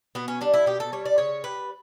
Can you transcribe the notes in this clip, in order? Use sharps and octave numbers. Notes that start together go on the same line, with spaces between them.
B2 B3
C#4
G3 D4
E4
B2 G4
A4
G3 C#5
D5
C#3 C#5
G3 B4